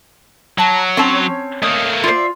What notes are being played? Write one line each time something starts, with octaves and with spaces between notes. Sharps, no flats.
F#3 F#4 A5 A#5
C4 C#4 C#5 A5 C#6
A3 A#3 D#5
F4 C5 D5 E5